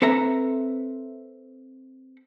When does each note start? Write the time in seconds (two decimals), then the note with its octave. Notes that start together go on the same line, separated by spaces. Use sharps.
0.02 C4 A4 B4 E5 A#5